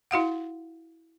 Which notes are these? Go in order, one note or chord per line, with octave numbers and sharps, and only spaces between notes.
E4 F#4 F5 F#5